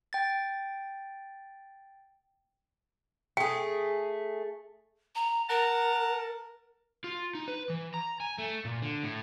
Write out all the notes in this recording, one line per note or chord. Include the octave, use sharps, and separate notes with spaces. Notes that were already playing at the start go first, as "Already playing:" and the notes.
G5 A6
A3 G#4 G5
A#5
A#4 F#5 A5 A#5
F4
D#4
B4
E3
A#5
G#5
A3
A#2
D3
A2